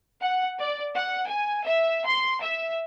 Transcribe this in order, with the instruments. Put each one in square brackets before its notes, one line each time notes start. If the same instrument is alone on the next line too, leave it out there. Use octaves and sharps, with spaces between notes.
[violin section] F#5
D5
F#5
G#5
E5
C6
E5